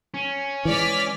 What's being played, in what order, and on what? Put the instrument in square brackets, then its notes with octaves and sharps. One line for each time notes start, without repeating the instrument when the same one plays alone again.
[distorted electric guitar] C#4
[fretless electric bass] E3 G#3 [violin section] D5 F6 B6